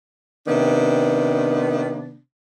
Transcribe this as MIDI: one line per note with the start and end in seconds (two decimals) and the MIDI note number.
0.47 2.18 48
0.47 2.18 51
0.47 2.18 59
0.47 2.18 62